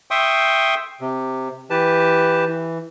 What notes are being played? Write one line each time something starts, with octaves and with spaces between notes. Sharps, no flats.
E5 G5 C6 C#6 D#6
C3
E3 G4 B4 A5
E3